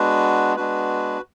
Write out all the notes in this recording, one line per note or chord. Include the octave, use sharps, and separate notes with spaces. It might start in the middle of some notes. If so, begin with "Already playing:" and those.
Already playing: G#3 B3 D4 F#4 B4
G#3 B3 D4 F#4 B4